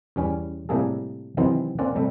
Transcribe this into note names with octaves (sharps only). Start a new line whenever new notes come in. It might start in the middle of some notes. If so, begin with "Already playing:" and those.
E2 G3 C#4
A2 C3 G3 A#3 G#4 A4
C3 D#3 E3 F#3 B3 C4
A#3 C4 C#4 D5 F#5
C3 G3 A3 E5